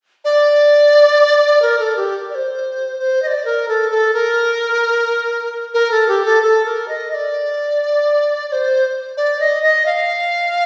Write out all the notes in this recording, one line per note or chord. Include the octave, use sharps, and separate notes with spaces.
D5
A#4
A4
G4
D5
C5
C5
D#5
D5
A#4
A4
A4
A#4
A#4
A4
G4
A4
A4
A#4
D#5
D#5
D5
D5
C5
D5
D#5
D#5
F5